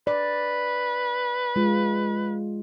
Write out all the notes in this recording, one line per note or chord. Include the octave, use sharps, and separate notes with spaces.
B4 D5
G#3 F4